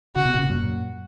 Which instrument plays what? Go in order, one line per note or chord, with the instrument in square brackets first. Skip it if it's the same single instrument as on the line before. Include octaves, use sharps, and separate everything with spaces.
[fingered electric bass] C#3 [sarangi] F#4
[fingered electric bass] B2
A#2 C#3
F#2 A#2